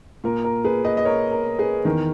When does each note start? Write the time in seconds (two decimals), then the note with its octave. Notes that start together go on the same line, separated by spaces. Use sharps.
0.24 A#2 A#4
0.44 A#4
0.64 G#4 B4
0.84 B4 D#5
0.97 D#5
1.05 A#4 C#5
1.31 A#4
1.59 G#4 B4
1.85 E2 D#3 A#4